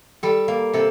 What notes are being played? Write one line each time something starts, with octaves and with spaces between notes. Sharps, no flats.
G3 A4
A#3
C3 A4